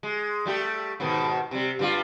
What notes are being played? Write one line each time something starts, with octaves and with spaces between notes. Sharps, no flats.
G#3
G3 A3 G4
G#2 B2 D#3
C3 G3
G2 G3 F4